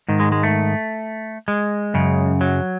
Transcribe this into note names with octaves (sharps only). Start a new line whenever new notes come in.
G#2 D#3
G#3
G#3
A3
G#3
F#2 C#3
F#3